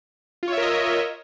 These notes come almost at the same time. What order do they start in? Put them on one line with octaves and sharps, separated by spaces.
F4 C#5 E5 A#4 D#5